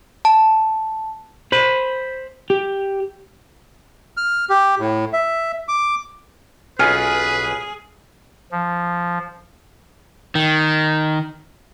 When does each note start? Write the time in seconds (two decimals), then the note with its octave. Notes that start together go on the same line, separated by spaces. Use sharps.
0.25 A5
1.52 C5 B5
2.50 G4
4.17 F6
4.50 G4
4.79 A2
5.13 E5
5.68 D6
6.79 B1 C#4 F4 G#4 B4 G#5 F6
8.52 F3
10.35 D#3